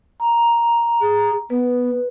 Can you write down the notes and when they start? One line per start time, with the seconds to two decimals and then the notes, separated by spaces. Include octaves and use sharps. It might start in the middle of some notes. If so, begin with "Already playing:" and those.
0.20 A#5
1.01 G#4
1.50 B3 B4